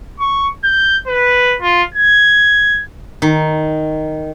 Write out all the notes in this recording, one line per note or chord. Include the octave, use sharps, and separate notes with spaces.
C#6
G6
B4
F4
G#6
D#3